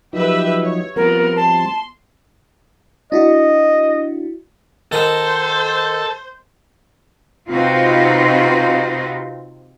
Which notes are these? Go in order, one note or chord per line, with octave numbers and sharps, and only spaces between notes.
F3 F#3 D#4 G4 B4 E5
C#5
F3 G3 B3 C4 F4 F#4 A#4
A5 C6
D4 E4 F#4 D#5
D#3 F#4 A4 C5 A5 A#5
C3 C4 D#4 F4 F#4 B4